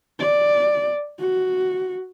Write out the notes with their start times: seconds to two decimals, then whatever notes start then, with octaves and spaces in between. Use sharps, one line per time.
0.19 D5
1.19 F#4